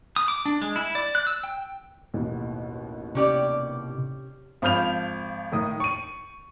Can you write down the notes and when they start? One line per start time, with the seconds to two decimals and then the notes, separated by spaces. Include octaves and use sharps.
0.16 D#6
0.28 D6
0.46 D4
0.62 G#3
0.76 E4
0.95 D5
1.15 F#6
1.27 E6
1.43 G5
2.14 A1 D#2 B2
3.15 C3 C#4 G4 D5
4.62 G#1 F3 B5 F6 G6 F7
5.52 A2 D#3 D#6
5.80 C#6 D#7